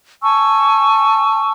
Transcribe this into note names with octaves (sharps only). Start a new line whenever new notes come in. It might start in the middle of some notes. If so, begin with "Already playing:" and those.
G#5 A5 C#6 E6